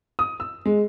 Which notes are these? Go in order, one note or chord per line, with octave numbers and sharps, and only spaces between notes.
D#6
E6
G#3